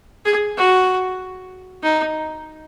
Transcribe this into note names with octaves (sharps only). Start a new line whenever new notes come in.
G#4
F#4
D#4